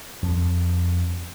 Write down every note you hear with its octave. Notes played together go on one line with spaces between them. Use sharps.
F2